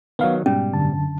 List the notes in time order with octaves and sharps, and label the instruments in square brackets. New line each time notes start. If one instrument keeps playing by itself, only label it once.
[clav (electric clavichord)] D#3 F#3 [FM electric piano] B3 F5
[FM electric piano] G#2 B2 [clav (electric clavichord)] G3 [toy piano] C#4
[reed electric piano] F#2 D3 A5